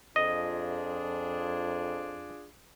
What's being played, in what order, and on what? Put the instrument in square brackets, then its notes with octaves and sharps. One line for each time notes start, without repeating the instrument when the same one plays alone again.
[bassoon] F2 [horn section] D4 F4 G#4 [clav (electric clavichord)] D#5